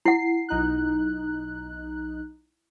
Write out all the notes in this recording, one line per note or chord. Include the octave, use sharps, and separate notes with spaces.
E4 F#5 C7
B1 D#4 F#6